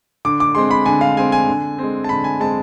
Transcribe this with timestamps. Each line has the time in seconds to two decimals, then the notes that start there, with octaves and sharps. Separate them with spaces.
0.25 D3 D6
0.40 D6
0.55 G#3 C4 C6
0.71 B5
0.86 D3 G#5
1.01 F5
1.17 G#3 C4 G#5
1.32 G#5
1.48 D3
1.79 G#3 C4
2.04 A5
2.09 D3 B5
2.24 G#5
2.40 G#3 C4 A5